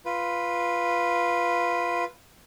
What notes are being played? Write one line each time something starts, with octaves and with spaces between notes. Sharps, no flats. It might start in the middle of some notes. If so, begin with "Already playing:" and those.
F4 B4